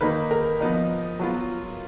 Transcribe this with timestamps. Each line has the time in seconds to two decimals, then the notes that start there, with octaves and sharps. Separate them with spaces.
0.01 D#3 A#3 D#4 B4
0.31 A#4
0.60 F3 B3 D#4
1.19 F#3 B3 F4